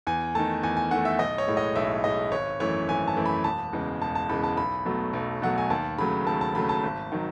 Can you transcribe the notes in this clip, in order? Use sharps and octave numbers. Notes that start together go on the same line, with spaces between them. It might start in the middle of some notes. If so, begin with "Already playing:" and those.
E2 G#5
D#3 A3 A5
E2 G#5
G#5
D#3 A3 F#5
E5
B1 D#5
C#5
A2 G#3
D#5
B1 E5
A2 G#3 D#5
G#1 C#5
F#2 E3 A3 C#5
G#1 G#5
A5
F#2 E3 A3
B5
E1 A5
E2 C#3 G#3
E1 A5
A5
E2 C#3 G#3 B5
A5
B1 B5
B2 F#3 A3
B1
B2 F#3 A3 F#5
G#5
D#2 A5
C#3 F#3 A3 B5
D#2 A5
A5
C#3 F#3 A3 B5
A5
G#1
D#3 F#3